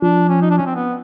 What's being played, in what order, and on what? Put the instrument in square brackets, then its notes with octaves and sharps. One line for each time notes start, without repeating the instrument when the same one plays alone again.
[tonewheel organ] F3 [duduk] D4
[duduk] C#4
D#4
D4
C#4
C4
B3